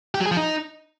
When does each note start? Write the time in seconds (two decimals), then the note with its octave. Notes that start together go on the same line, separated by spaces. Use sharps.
0.14 G4
0.20 F#3
0.26 G#4
0.31 F3
0.37 D#4